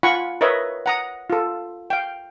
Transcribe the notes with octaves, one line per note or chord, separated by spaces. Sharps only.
F4 F#5 G#5 B5 C#6
A#4 B4 C#5 D#5 E5
F#5 A#5 D#6
F4 A4
F5 G5